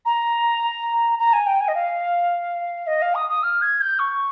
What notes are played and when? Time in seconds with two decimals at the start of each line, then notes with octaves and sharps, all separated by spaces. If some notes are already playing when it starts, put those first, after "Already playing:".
0.05 A#5
1.19 A#5
1.33 G#5
1.46 G5
1.60 G#5
1.68 D#5
1.75 F5
2.87 D#5
3.02 F5
3.15 D#6
3.29 D#6
3.43 F6
3.62 G#6
3.81 G6
3.99 C#6